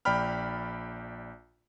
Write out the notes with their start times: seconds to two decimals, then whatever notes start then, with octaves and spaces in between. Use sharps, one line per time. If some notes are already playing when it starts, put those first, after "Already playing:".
0.05 A#1 D5 G5 B5 F6